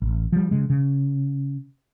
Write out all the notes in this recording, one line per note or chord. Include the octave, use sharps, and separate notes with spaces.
A1
F3 G3
C#3 G#3
C#3